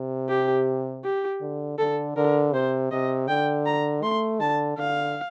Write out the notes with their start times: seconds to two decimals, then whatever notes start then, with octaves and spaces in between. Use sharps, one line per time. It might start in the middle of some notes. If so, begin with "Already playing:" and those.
Already playing: C3
0.29 G4
1.04 G4
1.41 D3
1.78 D3 A4
2.16 D3 A#4
2.54 C3 C5
2.91 C3 D#5
3.28 D3 G5
3.66 A#5
4.03 A3 C6
4.41 D3 A5
4.78 D3 F5